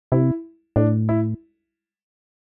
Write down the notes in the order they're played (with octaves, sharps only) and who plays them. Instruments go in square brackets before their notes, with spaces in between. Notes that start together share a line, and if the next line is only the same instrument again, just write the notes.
[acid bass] C3 [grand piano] E4
[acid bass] A2 [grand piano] D4
[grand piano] E4